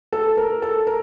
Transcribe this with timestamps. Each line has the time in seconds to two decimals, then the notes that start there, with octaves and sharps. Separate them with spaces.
0.12 A4
0.37 A#4
0.62 A4
0.87 A#4